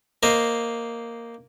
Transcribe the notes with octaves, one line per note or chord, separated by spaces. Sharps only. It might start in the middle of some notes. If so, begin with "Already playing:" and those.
A#3 C5 D#5